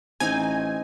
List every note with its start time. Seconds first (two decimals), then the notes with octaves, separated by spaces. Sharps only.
0.20 A1 C4 D#4 G#5